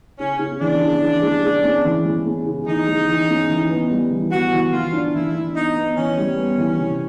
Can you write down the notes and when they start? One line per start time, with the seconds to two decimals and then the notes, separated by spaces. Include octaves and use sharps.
0.18 C#3 C#4
0.39 C#3
0.60 E3 D4
0.80 C#3
1.01 E3
1.22 G#3
1.42 G#3
1.63 C#4
1.84 E3
2.05 G#3
2.25 C#4
2.46 C#3
2.67 E3 D#4
2.87 G#3
3.07 E3
3.29 C#4
3.49 E3
3.70 B3
3.90 G3
4.11 E3
4.31 B3 F#4
4.53 E3
4.72 E3 F4
4.93 D4
5.14 E3 E4
5.35 D4
5.55 B3 D#4
5.76 B3
5.96 E3 C#4
6.18 G3
6.37 B3
6.58 E3
6.78 C3